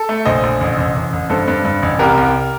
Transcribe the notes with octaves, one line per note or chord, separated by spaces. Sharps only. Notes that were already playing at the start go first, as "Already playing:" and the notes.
Already playing: A4
A3
A#1 C5 D#5
A#1
A1
A1
A1
A1
G2 A4 C5
G2
G2
A1
C2 G4 A#4
C2